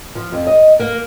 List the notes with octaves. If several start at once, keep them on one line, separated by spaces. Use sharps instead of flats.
F3
F2
D#5
A#3